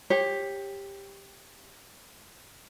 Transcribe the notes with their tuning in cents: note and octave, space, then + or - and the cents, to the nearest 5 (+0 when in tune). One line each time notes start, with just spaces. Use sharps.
G4 +10 C#5 -25